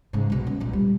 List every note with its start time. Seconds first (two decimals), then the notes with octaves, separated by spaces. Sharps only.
0.13 G#2 C#3
0.30 B1 B2
0.47 C#4
0.60 B1 A#2
0.73 G3